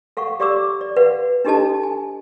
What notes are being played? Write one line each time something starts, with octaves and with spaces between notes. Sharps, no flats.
A4 F5 F#5 C#6
G4 D5 F5 C#6 D6 E6
D5
B4 D5 F5 F#5
D4 D#4 G4 A4 D#5 A5
G#5